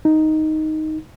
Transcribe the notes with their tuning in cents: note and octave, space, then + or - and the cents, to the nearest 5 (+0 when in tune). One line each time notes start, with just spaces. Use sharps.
D#4 +5